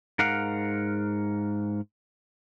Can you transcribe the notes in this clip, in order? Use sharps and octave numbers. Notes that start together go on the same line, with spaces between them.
G#2 A#4 F5 F#5